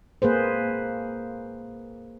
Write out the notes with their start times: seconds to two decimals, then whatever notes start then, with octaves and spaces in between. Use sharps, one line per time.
0.22 A#3 G#4 B4 C5